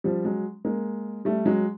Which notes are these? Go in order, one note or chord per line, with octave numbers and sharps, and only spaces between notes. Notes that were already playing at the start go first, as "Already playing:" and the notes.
F3 G3
F#3 G#3
G#3 A#3
G3 A3
F#3 G#3